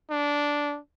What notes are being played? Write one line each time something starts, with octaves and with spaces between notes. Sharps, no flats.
D4